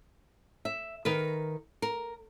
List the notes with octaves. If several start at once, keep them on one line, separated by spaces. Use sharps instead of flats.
E5
D#3 A#4 B4
A#4